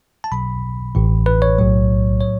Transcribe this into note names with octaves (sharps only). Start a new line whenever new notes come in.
A5
B1 B2 F#3 B5
A1 A2 E3
B4
C#5
B1 A2 F#3
A2 F#3 C#5